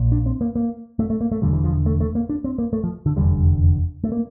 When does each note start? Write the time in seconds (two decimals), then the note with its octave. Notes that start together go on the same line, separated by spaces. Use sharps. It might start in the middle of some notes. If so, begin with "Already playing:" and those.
Already playing: A#1 A#2
0.12 D4
0.26 C4
0.41 A#3
0.55 A#3
0.99 A3
1.10 A3
1.21 A#3
1.32 A3
1.42 E1 E2 D3 G3
1.53 E3
1.64 F3
1.86 A3
2.00 A3
2.15 A#3
2.30 D4
2.44 C4
2.58 A#3
2.73 A3
2.84 F3
3.06 D3
3.16 F1 E2 D3 G3
4.04 A3
4.12 A#3